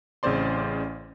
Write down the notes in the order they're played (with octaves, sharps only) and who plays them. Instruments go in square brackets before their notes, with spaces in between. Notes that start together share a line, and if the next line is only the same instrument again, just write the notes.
[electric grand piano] A1 C#3 C4 C5 D5 C6